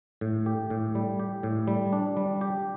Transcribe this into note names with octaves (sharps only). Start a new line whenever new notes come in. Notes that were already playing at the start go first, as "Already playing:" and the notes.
A2
G4
A2
G3
G4
A2
G3
D4
G3
G4